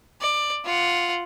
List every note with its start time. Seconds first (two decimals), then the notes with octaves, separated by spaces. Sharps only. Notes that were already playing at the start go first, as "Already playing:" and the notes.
0.21 D5
0.65 F4 F#5